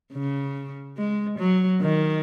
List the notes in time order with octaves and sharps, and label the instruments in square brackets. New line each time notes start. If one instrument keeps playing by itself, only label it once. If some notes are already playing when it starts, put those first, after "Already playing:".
[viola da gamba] C#3
G#3
F#3
D#3